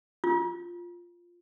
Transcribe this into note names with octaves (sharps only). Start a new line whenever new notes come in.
F4